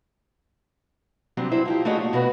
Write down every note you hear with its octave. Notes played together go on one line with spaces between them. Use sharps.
C3 F#3 G3 C4 D4
F#3 E4 C5
F3 D#4 G4
A3 E4 F#4 G#4 C#5 D#5
A#2
B2 F#4 B4